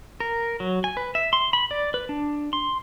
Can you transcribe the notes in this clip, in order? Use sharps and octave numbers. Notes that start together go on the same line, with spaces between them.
A#4
F#3
G#5
B4
E5
C6
B5
D5
B4
D4
C6